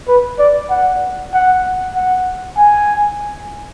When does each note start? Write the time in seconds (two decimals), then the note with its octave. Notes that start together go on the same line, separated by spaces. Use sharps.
0.08 B4
0.39 D5
0.71 F#5
1.34 F#5
1.95 F#5
2.58 G#5